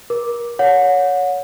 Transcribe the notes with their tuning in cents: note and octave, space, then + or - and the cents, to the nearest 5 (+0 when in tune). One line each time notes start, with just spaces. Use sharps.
A#4 +30 D6 +0
C#5 +20 F#5 -30